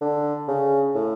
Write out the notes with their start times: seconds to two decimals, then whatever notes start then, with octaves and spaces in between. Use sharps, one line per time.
0.01 D3
0.48 C#3
0.95 A2